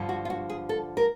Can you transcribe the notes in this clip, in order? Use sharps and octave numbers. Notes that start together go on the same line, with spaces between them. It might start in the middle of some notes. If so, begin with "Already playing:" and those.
Already playing: G2 D3 F3
F#4
F4
F#4
G#4
A4
A#4